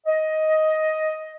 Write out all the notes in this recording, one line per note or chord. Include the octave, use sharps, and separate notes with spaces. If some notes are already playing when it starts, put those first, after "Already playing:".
D#5